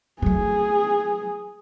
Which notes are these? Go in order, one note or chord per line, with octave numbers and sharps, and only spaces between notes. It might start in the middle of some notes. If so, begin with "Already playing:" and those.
F#3 A3 G#4